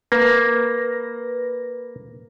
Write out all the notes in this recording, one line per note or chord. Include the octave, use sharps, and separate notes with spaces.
A#3 B4 A#6